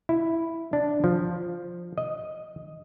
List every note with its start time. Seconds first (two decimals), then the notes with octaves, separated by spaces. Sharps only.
0.09 E4
0.73 D4
1.04 F3
1.98 D#5